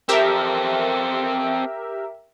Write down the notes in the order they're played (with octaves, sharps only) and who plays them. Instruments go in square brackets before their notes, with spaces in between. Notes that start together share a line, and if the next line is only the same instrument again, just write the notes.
[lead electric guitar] C4 A4 [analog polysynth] G4 A#4 E5